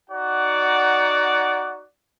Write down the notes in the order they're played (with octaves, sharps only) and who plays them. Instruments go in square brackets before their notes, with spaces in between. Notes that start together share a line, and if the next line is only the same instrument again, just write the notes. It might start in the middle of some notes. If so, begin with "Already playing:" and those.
[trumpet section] D#4 F#4 D5 F#5